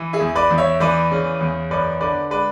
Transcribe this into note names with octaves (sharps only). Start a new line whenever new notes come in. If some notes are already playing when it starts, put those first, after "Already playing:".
Already playing: E3
E4 G#4
E2
B4 D5
E2
C#5 E5
E3 B4 D5
C#3
E2
F#2 B4 D5
D3 B4 D5
G#3 B4 D5